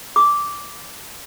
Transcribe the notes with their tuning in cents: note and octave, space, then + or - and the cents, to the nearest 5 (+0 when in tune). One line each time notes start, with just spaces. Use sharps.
D6 -10